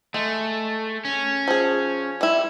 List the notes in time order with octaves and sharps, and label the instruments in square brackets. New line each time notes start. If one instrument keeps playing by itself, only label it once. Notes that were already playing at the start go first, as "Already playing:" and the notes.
[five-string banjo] G#3 [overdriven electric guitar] A3
[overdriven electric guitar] C#4
[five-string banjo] F3 G#4
G3 E4